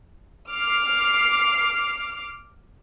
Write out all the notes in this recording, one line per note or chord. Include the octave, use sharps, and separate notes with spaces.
D6 F6 C7